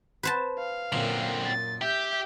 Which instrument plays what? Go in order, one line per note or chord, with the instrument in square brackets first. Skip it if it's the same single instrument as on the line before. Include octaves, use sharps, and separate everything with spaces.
[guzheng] B4 C5 A5
[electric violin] F5
[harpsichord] F#2 A#2 [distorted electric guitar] D3 C4
[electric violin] A6
[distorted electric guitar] G4 [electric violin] E5 G6